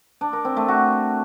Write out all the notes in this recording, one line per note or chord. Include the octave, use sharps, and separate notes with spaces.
D4
A#4
C4
A3
F#4